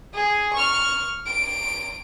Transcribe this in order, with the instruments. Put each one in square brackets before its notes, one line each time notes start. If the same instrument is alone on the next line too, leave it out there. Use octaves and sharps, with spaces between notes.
[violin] G#4
C#6 F6
D7